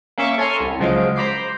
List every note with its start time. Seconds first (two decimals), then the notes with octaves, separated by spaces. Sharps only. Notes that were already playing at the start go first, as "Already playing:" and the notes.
0.18 A#3 C#4 E5 C#6 D6 E7
0.38 A4 C#5 G#5 A#5 C6 F6
0.60 C2
0.79 C#2 C#3 F3 F#3 G#3 D7
1.16 C5 A#5 B5 D6 G6 C7